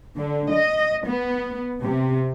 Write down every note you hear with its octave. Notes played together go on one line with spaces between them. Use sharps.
D3
D#5
B3
C3